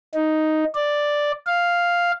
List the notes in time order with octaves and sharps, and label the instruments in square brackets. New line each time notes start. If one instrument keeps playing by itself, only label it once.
[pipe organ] D#4
D5
F5